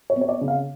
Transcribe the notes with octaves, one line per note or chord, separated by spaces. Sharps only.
C#5
B3
C#5
D5
C#3
F5